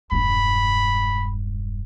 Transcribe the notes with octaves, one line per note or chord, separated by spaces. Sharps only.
E1 G2 B5